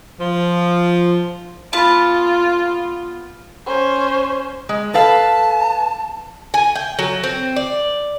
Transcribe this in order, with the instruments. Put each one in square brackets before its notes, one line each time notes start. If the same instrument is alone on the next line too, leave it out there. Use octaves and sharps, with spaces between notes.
[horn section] F3
[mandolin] B3 A5 [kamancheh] F4
[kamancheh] C#4 C5
[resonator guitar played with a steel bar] G#3
[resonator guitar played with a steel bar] A4 B4 F5 [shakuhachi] A5
[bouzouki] G#5
G5
F#3
C4
D5